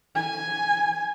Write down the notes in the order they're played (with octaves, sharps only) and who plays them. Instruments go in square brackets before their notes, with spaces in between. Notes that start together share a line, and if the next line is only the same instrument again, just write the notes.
[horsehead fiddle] G#5